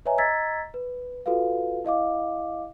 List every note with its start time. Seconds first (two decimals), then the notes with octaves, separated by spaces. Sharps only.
0.05 B4 C#5 D#5 E5 G#5 A#5
0.18 D#5 A#5 E6 G#6 A6 B6
0.74 B4
1.26 F4 F#4 A4 B4 F5
1.85 E4 D#5 F5 D6